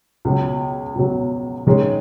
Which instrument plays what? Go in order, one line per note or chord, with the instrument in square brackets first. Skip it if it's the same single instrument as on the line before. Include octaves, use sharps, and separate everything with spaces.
[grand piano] C#2 B2 F#3
C#2 B2 F#3
D#3 G#3 C#4